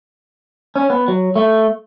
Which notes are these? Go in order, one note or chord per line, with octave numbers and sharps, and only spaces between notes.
C#4
B3
F#3
A3